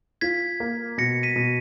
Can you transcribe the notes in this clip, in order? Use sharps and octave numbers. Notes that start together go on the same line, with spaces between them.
F4 G#6 B6
A#3
B2 A#6 C#7
B6 D#7
B2